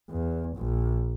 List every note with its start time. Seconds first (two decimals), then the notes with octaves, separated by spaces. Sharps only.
0.11 E2
0.57 A#1